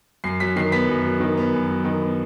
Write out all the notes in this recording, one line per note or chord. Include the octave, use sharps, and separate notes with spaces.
F#2 C7
F#3 B6
D#3 C7
B3 B6
F#2
F#3
D#3
B3
F#2
F#3
D#3
B3